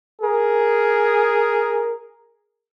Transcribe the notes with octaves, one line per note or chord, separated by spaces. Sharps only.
G#4 A#4